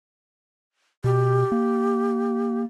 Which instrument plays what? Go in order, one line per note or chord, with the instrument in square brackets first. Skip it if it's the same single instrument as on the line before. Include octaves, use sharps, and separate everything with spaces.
[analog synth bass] B2 [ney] G4
[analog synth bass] A#3